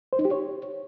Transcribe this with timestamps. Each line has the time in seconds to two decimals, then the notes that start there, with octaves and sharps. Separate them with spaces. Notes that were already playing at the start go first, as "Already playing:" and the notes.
0.13 C5
0.19 D#4
0.25 G4
0.31 C#5